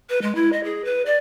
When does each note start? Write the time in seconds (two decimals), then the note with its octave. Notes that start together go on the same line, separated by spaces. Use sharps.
0.09 B4
0.22 G#3
0.35 E4
0.52 D#5
0.64 G#4
0.85 B4
1.06 D5